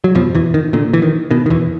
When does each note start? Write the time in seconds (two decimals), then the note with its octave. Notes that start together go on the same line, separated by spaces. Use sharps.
0.04 F#3
0.15 F2 B2 F3
0.35 E2 E3
0.54 D#3
0.73 A#2 D3
0.93 E3
1.02 D#3
1.31 B2 D#3
1.46 D#3
1.50 E2 E3